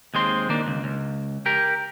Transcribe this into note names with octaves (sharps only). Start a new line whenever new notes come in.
D#2 G#3 C4 C6
D#3 A#3 D4
C#2
C#2
G4 A#4